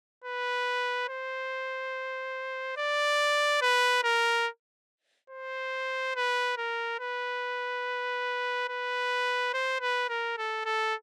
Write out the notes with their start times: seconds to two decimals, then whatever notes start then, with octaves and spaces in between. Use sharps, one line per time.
0.24 B4
1.09 C5
2.77 D5
3.62 B4
4.03 A#4
5.30 C5
6.16 B4
6.57 A#4
6.99 B4
8.69 B4
9.53 C5
9.81 B4
10.09 A#4
10.38 A4
10.65 A4